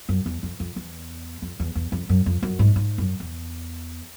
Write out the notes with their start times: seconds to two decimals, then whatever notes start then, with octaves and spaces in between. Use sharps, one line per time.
0.09 F#2
0.26 E2
0.43 F2
0.60 F2
0.76 E2
1.42 F2
1.60 E2
1.75 E2
1.92 F2
2.09 F#2
2.26 F2
2.42 F#2
2.59 G#2
2.76 G#2
2.98 F#2
3.20 E2